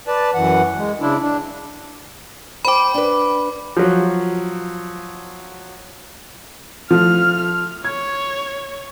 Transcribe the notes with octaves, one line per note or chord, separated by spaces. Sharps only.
B4 D5 A5
F#2 E3 F#5
G#3
C#3 D4 E4
D4
C5 G5 B5 D6
D4 B4
F3 F#3
F3 A3 F6
C#5 G#6